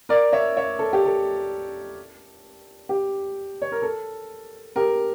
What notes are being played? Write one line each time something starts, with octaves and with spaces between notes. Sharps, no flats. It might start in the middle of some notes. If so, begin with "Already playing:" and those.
A#4 D5
C#5 E5
C#5 E5
A4
G4
A4
G4
C#5
A#4
A4
G4 A#4